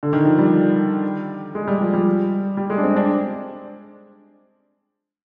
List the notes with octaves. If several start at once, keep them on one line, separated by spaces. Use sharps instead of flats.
D3
D#3
F3
G3
G#3
G3
F3
G3
G3
G#3
D4
C4
D4